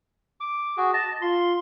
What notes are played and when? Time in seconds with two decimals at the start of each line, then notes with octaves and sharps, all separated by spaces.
0.40 D6
0.77 F#4 G#4
0.94 D#5 A5
1.22 F4 C6